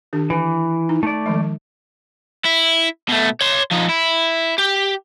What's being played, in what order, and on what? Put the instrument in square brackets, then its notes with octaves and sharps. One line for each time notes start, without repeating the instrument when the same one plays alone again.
[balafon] D#3 D4 G4
[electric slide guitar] E3 [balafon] B4
[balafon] D#4
[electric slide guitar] A3 D5
[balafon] D#3 F3 G#3
[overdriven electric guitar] E4
B2 A3
C#5 C6
F3 D#4
E4
G4